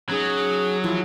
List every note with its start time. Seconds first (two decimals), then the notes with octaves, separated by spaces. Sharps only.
0.10 F#3 C#4 D#4 G#4
0.84 E3 F3 E4 F4